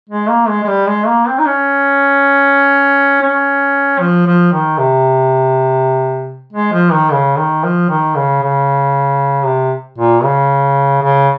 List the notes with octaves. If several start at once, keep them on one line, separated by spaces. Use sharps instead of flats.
G#3
A#3
G#3
G#3
G3
G#3
A#3
C4
D#4
C#4
C#4
F3
F3
D#3
C3
G#3
F3
D#3
C#3
D#3
F3
D#3
C#3
C#3
C3
A#2
C#3
C#3